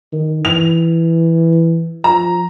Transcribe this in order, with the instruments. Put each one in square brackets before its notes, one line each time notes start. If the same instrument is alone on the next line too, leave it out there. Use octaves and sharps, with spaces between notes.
[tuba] D#3
[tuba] E3 [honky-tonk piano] F7
[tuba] F3 [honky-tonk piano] A#5